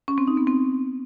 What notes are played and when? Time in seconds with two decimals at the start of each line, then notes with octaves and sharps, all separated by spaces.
0.08 C#4
0.18 C4
0.28 D#4
0.37 B3
0.47 C4